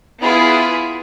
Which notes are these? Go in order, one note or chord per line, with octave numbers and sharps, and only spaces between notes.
B3 E4 F4 G#4 B4